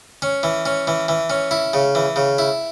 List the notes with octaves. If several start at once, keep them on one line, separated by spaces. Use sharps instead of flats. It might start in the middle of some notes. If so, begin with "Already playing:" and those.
C#4
E3
C#4
E3
E3
C#4
E4
C#3
E3
C#3
E4